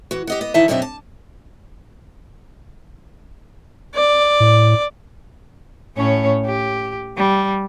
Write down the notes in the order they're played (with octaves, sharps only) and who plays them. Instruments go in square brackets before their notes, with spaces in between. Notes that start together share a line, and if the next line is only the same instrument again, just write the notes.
[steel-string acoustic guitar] E3 F#4
G4 D#5 F#5
B3 D#5
E2 D#3 D#4 E4 E5 A5
F#2 B2 C4 D4 D#4 E5
A5
[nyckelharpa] D5
[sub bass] A2
[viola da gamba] A2 C#4 C#5
G4
G3